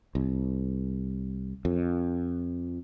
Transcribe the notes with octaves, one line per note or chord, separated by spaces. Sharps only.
C2
F2